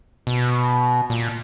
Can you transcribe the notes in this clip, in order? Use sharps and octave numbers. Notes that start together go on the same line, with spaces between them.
B2
A#2